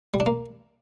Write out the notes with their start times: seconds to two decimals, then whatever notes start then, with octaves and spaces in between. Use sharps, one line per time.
0.14 G3
0.20 D4
0.26 A#3